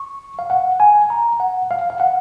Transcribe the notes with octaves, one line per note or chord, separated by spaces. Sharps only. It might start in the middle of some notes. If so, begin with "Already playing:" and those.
Already playing: C#6
F5
F#5
G#5
A#5
F#5
F5
F5
F#5